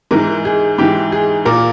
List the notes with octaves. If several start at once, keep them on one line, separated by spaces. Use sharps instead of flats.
G#2 E3 A#4
G#4
G#2 E3 G4
G#4
A#2 A#4